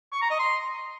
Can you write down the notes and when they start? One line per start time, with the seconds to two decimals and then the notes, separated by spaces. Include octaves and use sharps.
0.12 C#6
0.21 A#5
0.30 D#5
0.39 C6